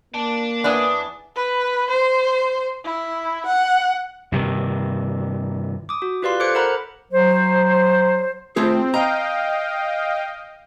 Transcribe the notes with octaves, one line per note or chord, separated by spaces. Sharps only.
A#3 D5 A5
E2 E3 B3 D4 G#4
B4
C5
E4
F#5
G2 C3 D#3
D6 D#6
F#4
F4 G4 B4 D5 F5 C6
A4 C5 D6 F#6 G#6 C#7
A4 A#4 C5 F#5 A#5 B5
F#3 C5
A3 C4 F4 G#4
D#5 F5 G5 A#5